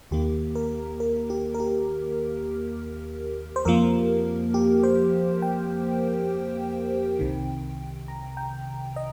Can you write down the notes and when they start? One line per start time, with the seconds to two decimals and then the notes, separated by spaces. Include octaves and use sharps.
0.11 D#2 D#3 A#3 G4
0.55 A#4
1.00 A#4
1.30 G4
1.54 A#4
1.60 G4
3.56 C5
3.65 F2 F3 A#3 A#4
4.54 G4
4.83 C5
5.42 G5
7.19 C2 C3 D#3
8.08 A#5
8.37 G5
8.96 D#5